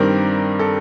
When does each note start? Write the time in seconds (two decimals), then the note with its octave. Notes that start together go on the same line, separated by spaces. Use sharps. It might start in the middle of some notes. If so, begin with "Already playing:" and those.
Already playing: G2 D#3 G3 C4 A#4
0.59 A4